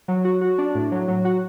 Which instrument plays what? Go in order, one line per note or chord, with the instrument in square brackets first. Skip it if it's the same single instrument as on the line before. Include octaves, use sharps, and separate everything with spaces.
[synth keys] F#3
F#4
F#4
D4
A2
F#3
F#3
F#4